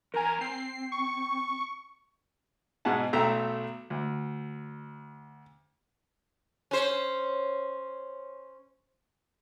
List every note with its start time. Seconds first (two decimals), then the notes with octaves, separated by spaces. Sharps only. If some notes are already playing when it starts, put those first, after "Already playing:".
0.14 E2 A#4 G#5 A#5
0.41 C4 C7
0.92 C#6
2.85 G#2 B2 G#4 F#5 A5
3.13 B1 A3 E5 G5 A#5
3.90 D2
6.71 C#4 C5